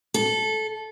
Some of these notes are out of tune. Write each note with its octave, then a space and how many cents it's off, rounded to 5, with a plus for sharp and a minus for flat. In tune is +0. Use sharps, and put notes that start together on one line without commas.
A4 -15